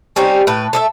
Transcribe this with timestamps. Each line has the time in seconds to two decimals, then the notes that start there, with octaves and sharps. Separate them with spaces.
0.16 G3 C4 C#4 D#4
0.47 A2 B4
0.73 A4 D#5 E5